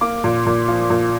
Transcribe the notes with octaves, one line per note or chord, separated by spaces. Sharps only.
A#3 D6
A#2
A#2
F3
A#2